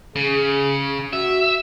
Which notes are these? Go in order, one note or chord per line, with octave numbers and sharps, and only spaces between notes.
C#3 G#4
F#4 E5